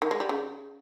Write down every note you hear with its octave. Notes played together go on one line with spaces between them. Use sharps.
D#3
G#3
G3
C#3